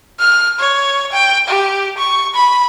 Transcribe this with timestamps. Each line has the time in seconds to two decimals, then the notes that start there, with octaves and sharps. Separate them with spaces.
0.19 F6
0.59 C#5
1.12 G5
1.48 G4
1.98 C#6
2.34 B5